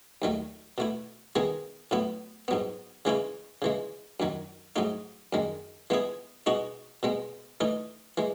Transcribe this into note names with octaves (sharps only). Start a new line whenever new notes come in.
D#2 D#3 F#3 A3
B2 A3 E4
D#3 G#3 B3 E4 G#4
A2 F#3 B3 E4
G#2 F#3 B3
C#3 E3 G#3 C#4 E4
C#3 E3 G#3
F#2 D#3 F#3
G#2 F#3 A3 D#4
F#2 D#3 G#3
E3 G#3 B3 E4 G#4
B2 G#3 D#4 F#4
B2 G#3 B3
E3 A3 D#4
E3 G#3